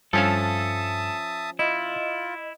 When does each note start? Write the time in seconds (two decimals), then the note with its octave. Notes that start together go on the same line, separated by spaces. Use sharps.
0.13 G2 F3 C#4 A4 E5 F5 A5 D#6
1.59 E4 F4 D#5